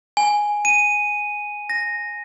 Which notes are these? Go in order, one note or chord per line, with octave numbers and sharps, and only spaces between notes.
G#5
D#7
A#6